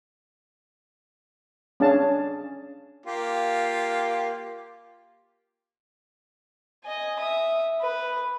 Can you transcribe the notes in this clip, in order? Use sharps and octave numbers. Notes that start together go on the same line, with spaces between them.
C#4 D4 G#4 F5 A5
A#3 F4 G4
D#5 G#5
E5 D#6
B4